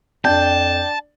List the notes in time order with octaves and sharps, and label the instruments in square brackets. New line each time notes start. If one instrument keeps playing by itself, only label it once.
[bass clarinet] F2 [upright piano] D4 [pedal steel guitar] G5 [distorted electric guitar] A5